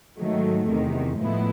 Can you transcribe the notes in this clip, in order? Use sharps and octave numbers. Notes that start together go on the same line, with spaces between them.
G#2 D#3 F#3 A3
E2 C3 D#3
A2 F3 G#3 B3 E4